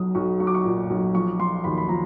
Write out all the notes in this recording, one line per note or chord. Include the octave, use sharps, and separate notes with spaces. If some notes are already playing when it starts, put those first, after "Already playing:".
Already playing: B1 F#3 D#6
B1 C#6
F#3 C#6
D6
C#6
A#2
B1
F3 C#6
F3 C6
D#2 B5
B5
F3 A#5